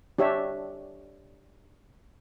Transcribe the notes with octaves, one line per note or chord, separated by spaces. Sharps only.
D4 G4 C#5 E5